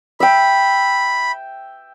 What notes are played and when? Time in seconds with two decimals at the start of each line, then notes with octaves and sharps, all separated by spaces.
0.20 E5 G5 B5